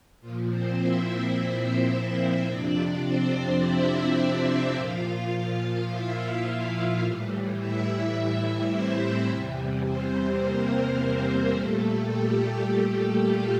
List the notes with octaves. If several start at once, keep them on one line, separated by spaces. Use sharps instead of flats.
A#2 F3 F4
C4 C5
E4 E5
E4 E5
F2 C3 F3 D4 D5
C4 C5
E4 E5
E4 E5
D4 D5
A#2 F3 F4 F5
E4 E5
E4 E5
A2 E3 G3
E4 E5
C4 C5
C4 C5
E2 C3 E3 G3
C4 C5
A#3 A#4
A#2 G3 A3 A4
G3 G4
G3 G4
F4